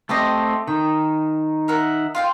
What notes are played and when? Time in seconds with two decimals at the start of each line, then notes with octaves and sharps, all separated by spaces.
0.09 A3 C4 G4 C5 D#5
0.67 D#3 G5
1.68 A#4 E5 F#5
2.15 F4 F5 G5